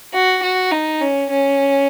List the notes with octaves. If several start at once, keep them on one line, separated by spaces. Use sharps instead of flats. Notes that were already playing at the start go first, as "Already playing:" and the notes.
F#4
F#4
D#4
C#4
C#4